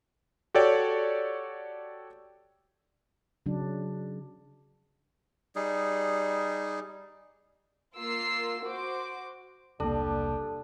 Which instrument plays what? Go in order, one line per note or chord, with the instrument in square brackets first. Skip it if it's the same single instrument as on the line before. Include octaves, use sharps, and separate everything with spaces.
[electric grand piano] F#4 G4 A4 C#5 D5 G5
[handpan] C#3 F#3 D4
[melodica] G3 D#4 G#4
[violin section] A#3 F4 E6 C7
F#4 C5 D6
[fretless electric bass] E1 C2 A#3 [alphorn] G3 [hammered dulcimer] D4 [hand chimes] A4 A5